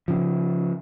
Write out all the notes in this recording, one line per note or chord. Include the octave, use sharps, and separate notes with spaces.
C#3 F3